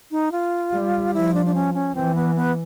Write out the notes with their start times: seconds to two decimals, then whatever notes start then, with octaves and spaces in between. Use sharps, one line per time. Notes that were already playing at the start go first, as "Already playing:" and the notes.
0.11 D#4
0.32 F4
0.73 G3
1.14 F3 E4
1.34 D4
1.46 D4
1.54 C#4
1.74 C#4
1.95 E3 C4
2.15 B3
2.36 B3